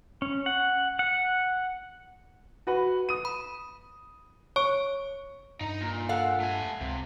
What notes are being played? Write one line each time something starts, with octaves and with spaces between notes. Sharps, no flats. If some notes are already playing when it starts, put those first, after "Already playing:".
C#4
F#5
F#5
F#4 B4 F#5
D#6 D#7
B5
C#5 C#6
G2 D#4 A#5
A#2
A4 F5 F#5
A3 G#5
C#2 C3